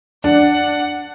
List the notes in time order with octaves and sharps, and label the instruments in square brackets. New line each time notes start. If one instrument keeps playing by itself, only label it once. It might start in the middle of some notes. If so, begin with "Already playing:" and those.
[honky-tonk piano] D4 [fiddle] F#5